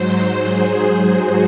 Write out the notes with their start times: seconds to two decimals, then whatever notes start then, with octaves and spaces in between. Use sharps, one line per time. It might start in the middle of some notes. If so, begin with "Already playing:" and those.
Already playing: G#2 F#3 C5
0.40 G#4
1.08 F#4